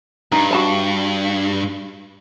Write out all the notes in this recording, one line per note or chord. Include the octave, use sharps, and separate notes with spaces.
G2 D#4
F#4 A5 B5